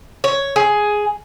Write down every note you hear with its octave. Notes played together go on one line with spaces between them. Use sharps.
C#5
G#4